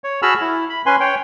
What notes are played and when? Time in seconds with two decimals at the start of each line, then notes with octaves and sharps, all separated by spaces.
0.04 C#5
0.22 F#4 G#4 A5 B5 E6 F6
0.41 E4
0.70 B5
0.86 C#4 B4 G#5 C6
1.00 C#5 G5